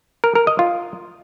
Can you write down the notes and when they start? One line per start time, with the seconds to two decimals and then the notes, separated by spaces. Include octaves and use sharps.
0.24 A#4
0.35 A#4
0.47 D#5
0.59 F4